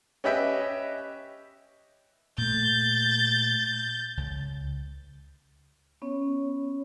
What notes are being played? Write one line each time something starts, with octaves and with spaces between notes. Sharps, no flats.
C#4 G4 B4 D#5 E5 G5
A#2 A3 G6 A6
C#2
B3 C#4 C#5